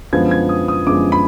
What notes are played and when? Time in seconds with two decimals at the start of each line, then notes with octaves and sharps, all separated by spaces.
0.13 F#2 D3 F3 G#3 B3 G#6
0.31 G#6
0.49 D#6
0.68 D#6
0.87 F#2 D3 F3 G#3 B3 D6
1.12 B5